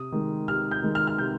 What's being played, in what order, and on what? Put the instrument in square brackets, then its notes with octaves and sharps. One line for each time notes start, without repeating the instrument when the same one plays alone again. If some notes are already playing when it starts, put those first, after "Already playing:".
Already playing: [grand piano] C3 D#6
D#3 G#3
C3 F6
G6
D#3 G#3
F6
F6
C3 G6